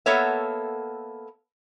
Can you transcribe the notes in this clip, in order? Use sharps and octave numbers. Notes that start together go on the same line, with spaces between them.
A#3 B3 A4 C#5 E5